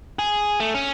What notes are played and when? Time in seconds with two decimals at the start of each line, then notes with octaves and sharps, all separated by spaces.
0.19 G#4
0.60 A3
0.75 C#4